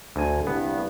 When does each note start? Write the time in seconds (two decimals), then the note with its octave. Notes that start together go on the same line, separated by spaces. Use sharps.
0.16 D2 G#5
0.47 C2 G2 B3